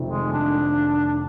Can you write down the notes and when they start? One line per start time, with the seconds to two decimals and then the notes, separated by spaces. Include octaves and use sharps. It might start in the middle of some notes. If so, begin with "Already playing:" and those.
Already playing: F1 F2 C3 D#3
0.10 G#3
0.32 D4